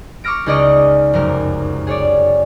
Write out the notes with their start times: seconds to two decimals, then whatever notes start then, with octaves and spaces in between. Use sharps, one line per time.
0.24 C#6 D6 E6 F6 A#6 D7
0.46 C#2 D#4 G#4 D5 D#5 C#6
1.13 F1 F#2 A#4
1.87 G#4 C#5 D5